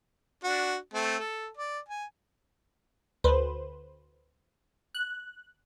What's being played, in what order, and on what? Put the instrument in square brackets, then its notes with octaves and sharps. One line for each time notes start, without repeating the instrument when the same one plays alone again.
[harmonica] D4 F#4
A3 C4
A4
D5
G#5
[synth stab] D2 B4 C5
F#6